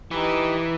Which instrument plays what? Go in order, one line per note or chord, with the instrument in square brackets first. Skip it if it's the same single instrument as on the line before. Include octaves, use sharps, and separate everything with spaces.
[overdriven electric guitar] E3 [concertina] D#4 G4 B4